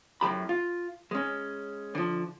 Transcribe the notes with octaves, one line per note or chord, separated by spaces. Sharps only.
F#2 A2 F3 G4 B5
F4
G#3 C#4
D3 F3